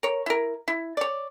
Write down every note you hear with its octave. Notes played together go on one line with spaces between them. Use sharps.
A#4 C#5
E4 A#4
E4
C#5 D5